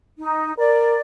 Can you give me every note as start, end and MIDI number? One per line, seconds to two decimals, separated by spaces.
0.19 0.53 63
0.58 0.97 70
0.58 1.01 74